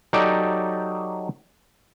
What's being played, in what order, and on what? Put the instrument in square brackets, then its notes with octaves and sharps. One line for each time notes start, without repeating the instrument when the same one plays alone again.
[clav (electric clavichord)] F#3 D#4 G4 A4 D5